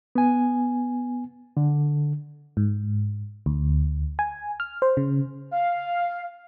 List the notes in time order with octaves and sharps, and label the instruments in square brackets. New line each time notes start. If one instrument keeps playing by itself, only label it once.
[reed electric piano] B3 G#5
D3
[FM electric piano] G#2
D2
G#5
F6
C5
C#3
[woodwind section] F5